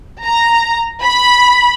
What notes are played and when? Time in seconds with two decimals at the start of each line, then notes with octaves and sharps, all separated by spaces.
0.23 A#5
1.02 B5